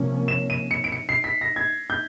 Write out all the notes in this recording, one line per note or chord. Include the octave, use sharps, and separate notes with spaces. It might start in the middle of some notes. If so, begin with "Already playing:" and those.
Already playing: C3 F3 A#3 C#4
E7
D#7
C#7
D7
C#7
C7
B6
A#6
G#6
G6